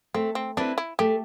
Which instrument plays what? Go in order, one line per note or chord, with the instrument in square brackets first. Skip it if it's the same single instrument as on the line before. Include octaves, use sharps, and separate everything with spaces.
[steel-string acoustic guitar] A3 [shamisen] C4
[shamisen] C4
[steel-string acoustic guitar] C4 E4 B4 [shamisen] D4
[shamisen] E4
[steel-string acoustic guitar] A3 [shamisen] G4